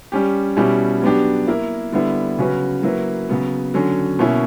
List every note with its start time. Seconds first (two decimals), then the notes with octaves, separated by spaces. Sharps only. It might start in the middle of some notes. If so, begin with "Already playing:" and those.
0.12 G3 C#4 G4
0.57 B2 G3 C#4 E4 G4
1.02 F#3 B3 D4 G4
1.47 A#3 E4 A#4
1.92 D3 G3 B3 E4
2.38 C#3 F#3 C#4 F#4 B4
2.83 F#3 A#3 E4 B4
3.29 C#3 F#3 B3
3.74 D3 F#3 C#4
4.19 B2 A#3 C#4 E4